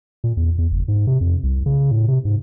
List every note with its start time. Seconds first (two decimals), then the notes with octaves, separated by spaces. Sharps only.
0.24 A#2
0.37 E2
0.58 E2
0.72 F#1
0.88 G#2
1.07 C3
1.21 F2
1.43 C2
1.66 C#3
1.91 A2
2.08 C3
2.25 G#2